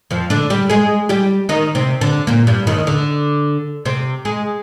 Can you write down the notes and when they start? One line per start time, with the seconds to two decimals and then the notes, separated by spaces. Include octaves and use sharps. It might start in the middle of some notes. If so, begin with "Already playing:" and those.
0.11 F2 F3
0.30 D3 D4
0.50 G3 G4
0.69 G#3 G#4
1.09 G3 G4
1.49 D#3 D#4
1.75 C3 C4
2.01 D3 D4
2.27 A#2 A#3
2.47 G2 G3
2.67 D#2 D#3
2.87 D3
3.85 C3 C4
4.25 G#3 G#4